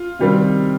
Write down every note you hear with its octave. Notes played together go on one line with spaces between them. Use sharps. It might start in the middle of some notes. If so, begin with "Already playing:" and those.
Already playing: F4
C3 D#3 G3 C4